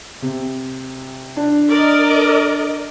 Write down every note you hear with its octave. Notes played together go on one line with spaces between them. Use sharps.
C3
D4
A#4 D5 D#5